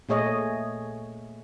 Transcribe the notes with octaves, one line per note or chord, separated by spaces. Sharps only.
A#2 A3 G#4 C#5 D#5